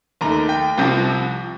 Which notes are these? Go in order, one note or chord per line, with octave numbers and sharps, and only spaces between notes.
D#2 D#3 A3 A#5
G5
C2 C3 F3